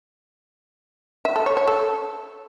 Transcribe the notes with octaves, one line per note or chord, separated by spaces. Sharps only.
E5
A4
C#5
C#5
A4